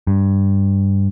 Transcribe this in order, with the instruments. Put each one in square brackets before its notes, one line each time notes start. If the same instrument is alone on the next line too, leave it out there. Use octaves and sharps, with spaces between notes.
[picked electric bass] G2